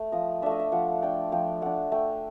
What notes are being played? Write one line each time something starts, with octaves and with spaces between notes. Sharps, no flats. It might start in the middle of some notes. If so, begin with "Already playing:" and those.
Already playing: A3
F3 D#5
A3 D4 E5
D#5
E5
F3 F#5
A3 D4 G5
F3 G5
A3 D4 F#5
A3 G5